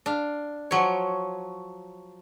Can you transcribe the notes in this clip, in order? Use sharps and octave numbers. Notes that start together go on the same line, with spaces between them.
D4 F5
F3 F#3 C#5